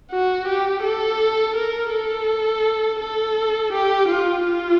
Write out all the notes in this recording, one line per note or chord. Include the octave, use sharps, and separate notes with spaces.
F#4
G4
A4
A#4
A4
A4
G4
F4
F4